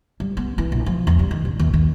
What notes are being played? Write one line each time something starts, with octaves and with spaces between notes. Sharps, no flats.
G3
B3
E3
A#1
F3
E2
G3
D#3
A1
D#2
D#2